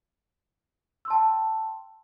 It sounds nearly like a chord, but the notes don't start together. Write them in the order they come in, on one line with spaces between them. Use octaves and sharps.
E6 C6 A5 G5